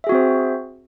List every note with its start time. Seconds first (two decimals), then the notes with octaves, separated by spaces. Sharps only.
0.04 E5
0.07 G#4
0.09 F#4
0.12 C4
0.15 C5